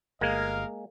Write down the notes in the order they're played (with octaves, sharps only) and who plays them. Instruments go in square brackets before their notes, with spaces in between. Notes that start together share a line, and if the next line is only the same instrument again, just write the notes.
[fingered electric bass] G1 [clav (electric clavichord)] G#3 A#3 [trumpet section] A#4 D#5 F5